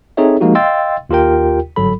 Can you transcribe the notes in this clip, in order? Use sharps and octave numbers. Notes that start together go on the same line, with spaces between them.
C4 D#4 G#4 A4 C#5 E5
F3 G#3 A#3 D#4 F#4 G4
D#5 F5 G5 C6 E6 A6
D#2 F4 G4 A#4 G5
G1 G#2 F#3 A4 B5